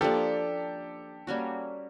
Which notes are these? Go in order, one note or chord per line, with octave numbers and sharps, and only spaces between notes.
F3 A#3 D4 G4 A4
G3 A#3 C#4 F#4